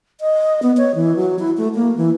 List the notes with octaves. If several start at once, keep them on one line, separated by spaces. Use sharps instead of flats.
D#5
B3
C#5
E3
F#3
E4
A3
A#3
E3